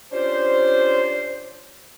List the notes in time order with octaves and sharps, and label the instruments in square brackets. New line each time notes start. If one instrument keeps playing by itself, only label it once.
[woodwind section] C#4 D4 F4 G4 C5